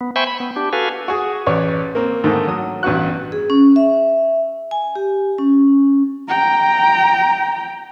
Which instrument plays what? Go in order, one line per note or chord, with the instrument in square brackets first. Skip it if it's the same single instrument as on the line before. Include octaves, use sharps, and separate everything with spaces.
[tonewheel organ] B3
C5 E5 G5 G#5 B5 C#6
B5
B3
D4 G4
F#4 A4 B4 F5 G#5
[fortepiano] F#4 G#4
A1 B4 C#5 D5
A#3 C4
G#2 D3 D#3 A3 A#3 C4
F#3 D#6
A1 G2 B3 F#4 F#6
[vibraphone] G#4
C#4
E5
G#5
G4
C#4
[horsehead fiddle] G5 A#5